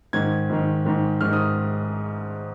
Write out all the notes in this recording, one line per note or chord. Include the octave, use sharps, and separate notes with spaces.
G#2 D#3 G#6
G#2 D#3
G#2 D#3
G#2 D#3 F6
D#6